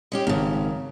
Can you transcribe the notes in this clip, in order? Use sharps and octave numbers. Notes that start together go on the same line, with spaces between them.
G#3 C#4 G4
G#1 F#2 C#3